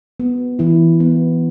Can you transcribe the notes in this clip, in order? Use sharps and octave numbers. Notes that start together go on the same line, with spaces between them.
B3
E3 E4
B3